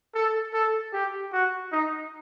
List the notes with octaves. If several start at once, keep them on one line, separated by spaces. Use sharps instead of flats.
A4
A4
G4
F#4
D#4